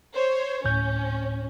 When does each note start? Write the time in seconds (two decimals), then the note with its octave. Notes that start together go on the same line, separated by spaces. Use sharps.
0.14 C5 C#5
0.64 D2 A2 C#4 G6